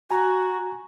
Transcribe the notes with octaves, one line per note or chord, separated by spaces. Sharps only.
F#4 G#5 A#5